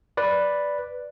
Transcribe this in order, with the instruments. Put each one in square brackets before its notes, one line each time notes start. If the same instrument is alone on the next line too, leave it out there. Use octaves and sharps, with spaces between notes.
[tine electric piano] B4 D5